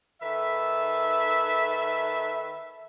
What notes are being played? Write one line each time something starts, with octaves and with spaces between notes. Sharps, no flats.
D#3 A4 B4 E5